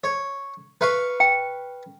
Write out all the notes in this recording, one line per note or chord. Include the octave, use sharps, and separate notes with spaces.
C#5
B4 F5 C#6
G5